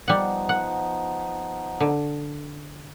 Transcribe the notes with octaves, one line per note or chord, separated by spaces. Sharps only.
F3 G3 B3 D#4 F#5
F#5
D3